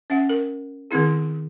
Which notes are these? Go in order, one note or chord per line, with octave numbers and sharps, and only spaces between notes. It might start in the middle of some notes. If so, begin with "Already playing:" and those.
C#4 E5 F#5
A#4
D#3 B3 C4 E4 G#4